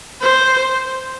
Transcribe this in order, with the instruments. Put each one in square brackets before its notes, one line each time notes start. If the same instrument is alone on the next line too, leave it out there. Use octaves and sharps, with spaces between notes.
[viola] C5